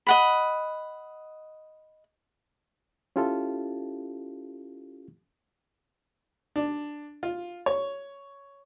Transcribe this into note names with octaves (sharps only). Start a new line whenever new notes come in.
D#5 F#5 B5
C#4 E4 F4 G4 A4
D4
F4
C#5